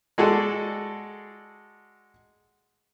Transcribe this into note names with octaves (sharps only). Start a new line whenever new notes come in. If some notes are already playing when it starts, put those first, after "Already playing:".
G#3 F#4 G#4 A4 D5